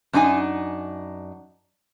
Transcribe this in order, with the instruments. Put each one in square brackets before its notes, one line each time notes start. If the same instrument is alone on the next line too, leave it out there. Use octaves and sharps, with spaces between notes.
[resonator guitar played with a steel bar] F#2 D4 D#4 F4 G#5